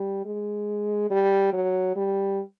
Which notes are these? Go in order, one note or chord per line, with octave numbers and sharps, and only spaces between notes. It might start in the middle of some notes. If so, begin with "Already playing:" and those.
Already playing: G3
G#3
G3
F#3
G3